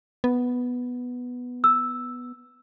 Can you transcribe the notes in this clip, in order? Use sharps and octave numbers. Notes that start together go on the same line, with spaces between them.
B3
E6